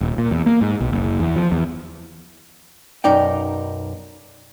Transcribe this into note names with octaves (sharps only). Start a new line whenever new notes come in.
D#1
A#2
E2
A#3
G#2
B1
F#1
E2
F3
E2
B1 F#2 D#4 D5 G5